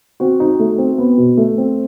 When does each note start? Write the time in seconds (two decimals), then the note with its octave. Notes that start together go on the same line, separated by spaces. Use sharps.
0.20 C4 F#4
0.40 D#4
0.59 A3
0.78 C4
0.98 B3
1.18 B2
1.37 A3
1.58 C4